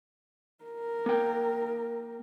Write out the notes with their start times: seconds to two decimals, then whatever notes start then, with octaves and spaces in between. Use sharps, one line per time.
0.64 A#4
1.06 A#3 G5